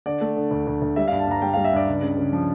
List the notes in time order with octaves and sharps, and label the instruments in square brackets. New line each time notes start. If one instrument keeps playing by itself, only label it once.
[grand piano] D3 D5
A3
D3
D2
D2
D2
G3 E5
F5
G2
A5
G2 A#5
G3 G5
F5
G3
E5
G2 D5
C#2
C#3
C#3
F3